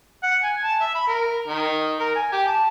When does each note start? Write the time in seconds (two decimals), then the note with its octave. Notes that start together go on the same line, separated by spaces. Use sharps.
0.23 F#5
0.43 G#5
0.63 A5
0.80 E5
0.95 B5
1.07 A#4
1.47 D#3
1.99 A#4
2.15 G#5
2.32 G4
2.47 A5